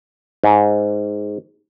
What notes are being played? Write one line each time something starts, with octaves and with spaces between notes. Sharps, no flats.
G#2